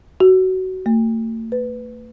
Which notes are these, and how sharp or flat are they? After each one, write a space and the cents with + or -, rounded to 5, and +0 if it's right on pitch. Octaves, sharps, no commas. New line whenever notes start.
F#4 +20
A3 +40
B4 +10